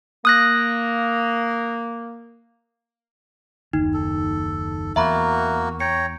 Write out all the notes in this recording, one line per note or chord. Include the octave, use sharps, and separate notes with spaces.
A#3 D#6 F#6 A#6
F#1 D#2 D#4
A4
E2 A#3 F#4 E5 A#5 B5
C#5 G5 A#5 C#7